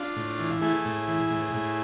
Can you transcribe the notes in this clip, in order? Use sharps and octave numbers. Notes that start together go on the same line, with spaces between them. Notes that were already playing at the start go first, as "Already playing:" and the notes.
Already playing: D4 F4
A2
E3
A3 E4 G#4
A2
E3
A2
A2